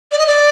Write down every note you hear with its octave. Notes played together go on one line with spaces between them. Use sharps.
D5
D#5
D5